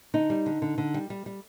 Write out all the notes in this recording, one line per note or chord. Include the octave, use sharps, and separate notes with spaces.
D3 D#4
G3
D3
D3
D3
G3
G3
G3